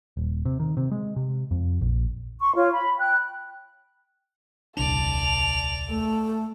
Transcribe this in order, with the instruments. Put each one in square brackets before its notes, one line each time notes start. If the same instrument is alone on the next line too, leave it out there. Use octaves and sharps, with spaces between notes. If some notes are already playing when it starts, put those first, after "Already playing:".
[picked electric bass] D#1
C3
D#3
C3
G#3
C3
F2
A#1
[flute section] C6 C#6
F4 C#5
B5
G5 F#6
[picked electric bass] D#1 C2 D4 [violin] D5 F7 [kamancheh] A5
[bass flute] A3 [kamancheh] A4